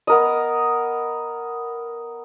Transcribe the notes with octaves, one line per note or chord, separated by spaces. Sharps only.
B3 A#4 D#5